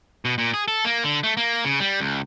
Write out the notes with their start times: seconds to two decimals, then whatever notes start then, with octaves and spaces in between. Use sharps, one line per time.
0.25 B2
0.38 A#2
0.54 G#4
0.68 A4
0.85 A#3
1.04 D3
1.24 A3
1.37 A#3
1.65 C#3
1.80 G3
2.00 C#2